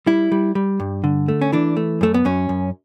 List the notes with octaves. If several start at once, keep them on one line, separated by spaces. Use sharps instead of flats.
G3 E4
G3
G3
G2
D3
A3
C#4
E3 D4
A3
F#2 A3
B3
F#2 C#4
F#2